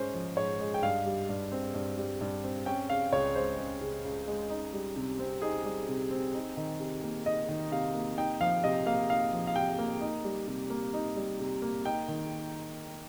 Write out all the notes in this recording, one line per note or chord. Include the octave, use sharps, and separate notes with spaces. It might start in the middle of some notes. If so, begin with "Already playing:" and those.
Already playing: G#2 G#3 C#4 C5
F3
G#2 C#5
G#3
G5
G2 F5
G3
G2
C4
G2
G3
G2
C4
C#4 G5
C#3 F5
C#2 C#5
G#3 C5
C#4
C#3
C#2
G#3
D#4
G3
C3
C4
D#4 G#4
G3
C3
C4
D#4
D#3
C3
A#3
D#4 D#5
D#3
C3 F5
A#3
D#4 G5
F3 F5
C3 D#5
A#3 F5
D#4 F5
F3
F5
C3 G5
A#3
D#4
G3
C3
A#3
D#4
G3
C3
A#3
D#4 G5
D#3